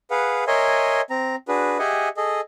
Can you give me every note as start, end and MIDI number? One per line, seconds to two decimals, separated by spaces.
0.11 0.44 68
0.11 0.44 71
0.11 0.44 77
0.11 0.44 78
0.47 1.01 70
0.47 1.01 73
0.47 1.01 75
0.47 1.01 76
0.47 1.01 80
0.47 1.01 84
1.10 1.36 60
1.10 1.36 82
1.48 1.78 62
1.48 1.78 66
1.48 1.78 68
1.48 1.78 71
1.79 2.09 67
1.79 2.09 68
1.79 2.09 75
1.79 2.09 76
1.79 2.09 78
1.79 2.09 80
2.17 2.41 68
2.17 2.41 69
2.17 2.41 75